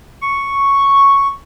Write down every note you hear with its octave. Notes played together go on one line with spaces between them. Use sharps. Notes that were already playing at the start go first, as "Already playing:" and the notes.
C#6